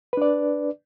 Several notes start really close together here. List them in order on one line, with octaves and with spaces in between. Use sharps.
B4 D4 D5